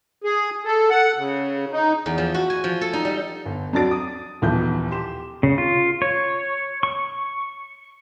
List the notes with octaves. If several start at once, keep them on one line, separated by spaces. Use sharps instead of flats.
G#4
A4
F#5
C#3
D#4
E2
F3
F#4
G#5
F3
A4
D#4
G3
G1
F2 F#3 D4 A5 A6 D7
D#6
D#1 B1 E3 F3 G6
G4 C6 E7
C#3
F4
C#5
C#6